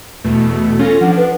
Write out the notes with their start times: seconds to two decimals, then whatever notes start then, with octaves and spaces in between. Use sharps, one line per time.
0.24 E2 B2 A3
0.79 C#4 F4 A4 A#6
1.01 F3 D4 F#5
1.17 B4